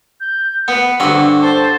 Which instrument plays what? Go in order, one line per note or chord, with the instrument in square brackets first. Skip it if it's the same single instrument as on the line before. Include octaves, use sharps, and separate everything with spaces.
[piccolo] G6
[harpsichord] B3 [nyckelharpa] B4 [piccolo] C#7
[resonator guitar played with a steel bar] G2 D3 [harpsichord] C4 F#4
[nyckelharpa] C5 [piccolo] A5